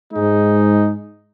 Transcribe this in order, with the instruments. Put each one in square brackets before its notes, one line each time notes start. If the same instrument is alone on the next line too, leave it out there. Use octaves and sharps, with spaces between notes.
[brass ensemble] G#2 G#3 D#4